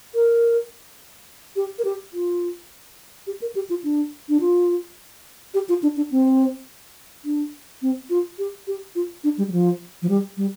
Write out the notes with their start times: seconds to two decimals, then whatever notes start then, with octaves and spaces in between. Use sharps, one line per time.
0.15 A#4
1.56 G4
1.79 A#4
1.85 G4
2.14 F4
3.27 G4
3.42 A#4
3.55 G4
3.70 F4
3.84 D4
4.29 D4
4.41 F4
5.54 G4
5.69 F4
5.83 D4
5.97 D4
6.11 C4
7.25 D4
7.82 C4
8.10 F4
8.39 G4
8.67 G4
8.95 F4
9.24 D4
9.38 G3
9.48 G3
9.52 F3
10.02 F3
10.09 G3
10.37 G3